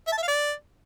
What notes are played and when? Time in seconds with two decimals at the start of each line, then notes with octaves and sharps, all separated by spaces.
0.07 E5
0.12 A5
0.18 E5
0.23 F5
0.28 D5